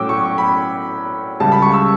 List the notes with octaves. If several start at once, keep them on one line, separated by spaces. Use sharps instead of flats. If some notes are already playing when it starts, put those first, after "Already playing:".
Already playing: A2 F#3 C#4 G5 D6 E6
C#6
C#6
B5
C#2 C#3 G3 A5
B5
C#6
E6